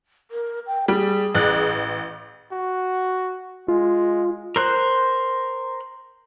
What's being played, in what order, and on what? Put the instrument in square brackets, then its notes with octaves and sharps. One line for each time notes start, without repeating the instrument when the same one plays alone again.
[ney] A#4
G5
[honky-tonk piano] G3 [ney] G#4
[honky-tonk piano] A1 F#6
[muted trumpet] F#4
[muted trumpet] G#3 [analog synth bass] F4
[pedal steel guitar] A#4 C5 F#6